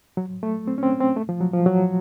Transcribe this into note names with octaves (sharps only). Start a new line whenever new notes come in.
F#3
A3
C4
C#4
C4
C4
A3
F3
F#3
F3
F#3